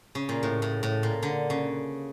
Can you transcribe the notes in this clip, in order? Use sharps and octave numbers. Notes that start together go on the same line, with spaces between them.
C#3
A#2
A2
A2
A2
A#2
D3
C#3